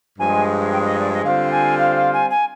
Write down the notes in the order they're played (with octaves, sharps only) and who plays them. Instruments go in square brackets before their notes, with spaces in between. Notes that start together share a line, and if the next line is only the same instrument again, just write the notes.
[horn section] G2 F3 G#3 [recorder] G#5
[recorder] G5
D5
D#5
D5
D#5
[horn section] D3 G3 C4 F4 C5 [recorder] F5
[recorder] G#5
F5
F5
G#5
G#5